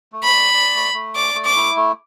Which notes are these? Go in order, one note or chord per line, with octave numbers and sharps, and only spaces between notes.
A3
B5
D5
D5
A3
A3
D5 D6
A3
D6
E4
A3